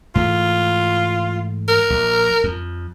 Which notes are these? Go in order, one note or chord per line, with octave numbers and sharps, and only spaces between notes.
G#2 E3 A3 F4
A#4
A#1
F2